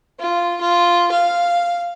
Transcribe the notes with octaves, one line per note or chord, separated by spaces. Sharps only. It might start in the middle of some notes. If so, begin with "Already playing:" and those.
F4
F4
F5